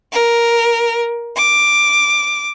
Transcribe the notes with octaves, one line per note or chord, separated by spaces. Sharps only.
A#4
D6